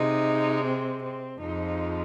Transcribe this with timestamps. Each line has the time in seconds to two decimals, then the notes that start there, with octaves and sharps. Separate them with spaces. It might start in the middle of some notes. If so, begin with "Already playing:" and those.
Already playing: C3 G#3 D#4
0.65 C4
1.02 C4
1.40 F2 F3 G#3 D#4